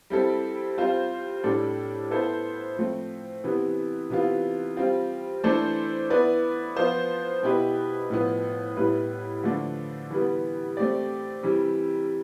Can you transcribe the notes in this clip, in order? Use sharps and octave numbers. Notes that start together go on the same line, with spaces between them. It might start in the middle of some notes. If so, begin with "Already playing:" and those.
G3 C4 E4 A4
G3 C4 F4 C5
A2 G3 D4 A4
B3 E4 A4 C5
F3 A3 C4
C3 E3 B3
C3 E3 B3 F4
G3 C4 F4
E3 A3 D4 A4 C5
B3 E4 B4 D5
F3 B3 F4 C5
B2 B3 E4 G4 B4
A2 F3 B3
A2 G3 B3 E4 B4
D3 F3 A3 D4
E3 G3 B3
A3 C4 G4 D5
C3 E3 G3